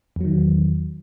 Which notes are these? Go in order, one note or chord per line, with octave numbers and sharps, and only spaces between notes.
E2 D#3 F#3